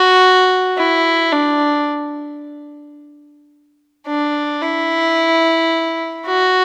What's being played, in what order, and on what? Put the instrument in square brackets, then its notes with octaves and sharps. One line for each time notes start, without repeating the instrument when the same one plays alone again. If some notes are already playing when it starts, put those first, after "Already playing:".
Already playing: [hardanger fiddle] F#4
E4
D4
D4
E4
F#4